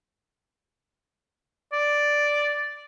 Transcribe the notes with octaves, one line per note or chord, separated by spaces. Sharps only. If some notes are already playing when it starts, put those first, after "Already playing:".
D5